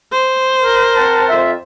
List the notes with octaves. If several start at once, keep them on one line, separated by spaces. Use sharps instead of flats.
C5
A#4
C4 F#5 A5
F2 F4 E5